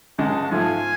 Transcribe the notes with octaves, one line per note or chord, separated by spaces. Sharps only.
C#2 C#3 G#3 F#5 A5
G#2 F3 A3 F4 F5 G#5